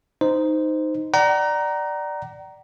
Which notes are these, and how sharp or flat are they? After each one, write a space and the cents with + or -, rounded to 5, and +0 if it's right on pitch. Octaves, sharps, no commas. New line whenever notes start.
D#4 +0 C5 -15
D5 +10 F#5 +45 A#5 +5